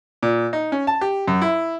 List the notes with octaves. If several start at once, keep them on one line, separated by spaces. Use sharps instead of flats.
A#2
D#4
C#4
A5
G4
F#2
E4